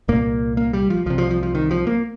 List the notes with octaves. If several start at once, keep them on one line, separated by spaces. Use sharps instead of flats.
C2 A#2 A#3
A#3
G3
F3
C2 C3 F3
F3
F3
F3
D#3
F3
A#3